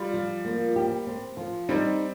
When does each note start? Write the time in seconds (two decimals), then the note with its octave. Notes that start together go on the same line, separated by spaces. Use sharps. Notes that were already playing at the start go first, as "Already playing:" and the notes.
Already playing: G3 F4
0.13 F3
0.45 A#3
0.76 G4
1.07 C4
1.37 F3
1.69 G3 C4 D#4